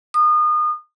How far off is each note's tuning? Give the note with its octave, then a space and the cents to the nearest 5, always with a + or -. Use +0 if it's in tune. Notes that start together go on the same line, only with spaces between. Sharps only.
D#6 -30